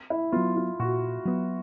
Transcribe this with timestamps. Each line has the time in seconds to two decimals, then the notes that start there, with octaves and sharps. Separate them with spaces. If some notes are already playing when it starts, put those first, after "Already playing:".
0.10 E4
0.32 F#3 B3 F4
0.57 F4
0.79 A#2 F#4
1.25 F#3 B3